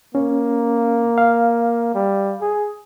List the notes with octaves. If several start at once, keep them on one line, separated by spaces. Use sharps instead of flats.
A#3 C#4
F5
G3
G#4